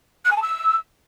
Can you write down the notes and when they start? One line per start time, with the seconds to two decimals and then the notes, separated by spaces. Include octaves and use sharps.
0.25 F#6
0.31 G#5
0.36 A5
0.42 E6